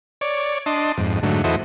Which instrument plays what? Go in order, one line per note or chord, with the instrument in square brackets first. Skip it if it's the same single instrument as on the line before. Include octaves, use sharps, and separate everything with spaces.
[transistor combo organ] C#5 D5
D4 D#5 A5 C6
F2 G#2
G#2 D3 F#3 A3
E2 E4 F#4 A4 C5 D#5